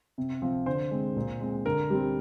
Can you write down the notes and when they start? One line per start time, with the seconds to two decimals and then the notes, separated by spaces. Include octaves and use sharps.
0.18 C3
0.42 F3 C4
0.66 D3 C5
0.91 G#3 C4
1.16 A#2
1.41 G#3 C4
1.66 D3 A#4
1.90 G3 C4